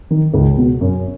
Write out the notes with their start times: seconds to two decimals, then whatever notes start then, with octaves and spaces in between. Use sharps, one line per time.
0.10 D#3
0.34 C#2
0.58 B2
0.81 F#2